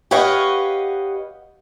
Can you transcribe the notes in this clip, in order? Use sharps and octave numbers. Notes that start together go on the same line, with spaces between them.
G4 B4 C#5 D#5 F5 F#5